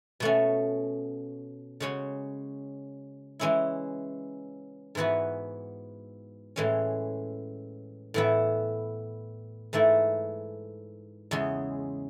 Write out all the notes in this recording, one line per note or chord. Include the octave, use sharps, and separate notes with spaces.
B2 A3 C#4 F#4
C#3 G#3 C#4 F#4 C#5
E3 G#3 C#4 E4
G#2 E3 B3 F#4 B4
A2 E3 G#3 C#4
A2 E3 B3 E4
G#2 E3 A3 E4
E2 C#3 G#3